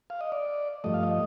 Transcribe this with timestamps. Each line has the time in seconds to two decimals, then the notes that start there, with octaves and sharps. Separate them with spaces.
0.10 F5
0.21 D#5
0.32 D5
0.84 G2 F3 A3 D#5
0.94 F5
1.03 D#5